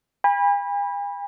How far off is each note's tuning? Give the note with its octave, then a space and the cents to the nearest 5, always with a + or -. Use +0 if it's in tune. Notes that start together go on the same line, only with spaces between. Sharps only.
G#5 -45 B5 -15